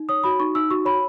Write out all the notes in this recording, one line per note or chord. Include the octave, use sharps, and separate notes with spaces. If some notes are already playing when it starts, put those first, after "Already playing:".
Already playing: D#4
C#5 D#6
F#4 B5
D#4 C#6
D#4 E6
F#4 C#6
C#5 B5